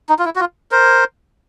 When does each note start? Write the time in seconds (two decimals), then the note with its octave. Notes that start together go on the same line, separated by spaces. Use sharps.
0.09 D#4
0.19 F4
0.25 E4
0.36 F#4
0.40 F4
0.71 A#4 C5